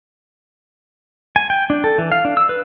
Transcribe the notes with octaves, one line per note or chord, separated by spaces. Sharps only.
G#5
G5
D4
A4
E3
F5
D4
E6
B4